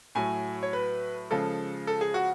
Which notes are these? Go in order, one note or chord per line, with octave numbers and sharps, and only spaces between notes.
A2 F#3 G#5
C#5
B4
C#3 F3 G#3 A4
A4
G#4
F#4